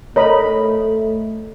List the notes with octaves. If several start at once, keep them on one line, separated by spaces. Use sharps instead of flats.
A3 A#4 C#5 D#5 B5